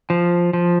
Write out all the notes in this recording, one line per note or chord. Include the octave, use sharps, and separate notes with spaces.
F3
F3